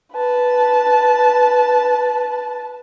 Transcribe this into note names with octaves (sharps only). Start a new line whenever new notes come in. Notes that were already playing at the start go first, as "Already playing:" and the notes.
B4 A5